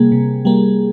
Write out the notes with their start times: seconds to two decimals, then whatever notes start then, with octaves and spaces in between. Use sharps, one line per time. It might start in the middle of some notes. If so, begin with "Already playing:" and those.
Already playing: C3 G3 A#3 G#4
0.12 C3
0.45 G3 A#3